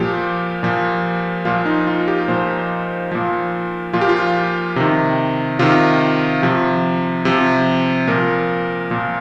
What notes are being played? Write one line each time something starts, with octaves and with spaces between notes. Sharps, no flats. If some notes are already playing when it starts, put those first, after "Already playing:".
Already playing: A#2 F3 G4
A#2 F3
A#2 F3 F4
D#4
F4
G4
A#2 F3 C5
A#2 F3
A#2 F3 F4
G4
F4
C3 D#3
C3 D#3 F4
C3 F3
C3 F3
A#2 F3 A#4
A#2 F3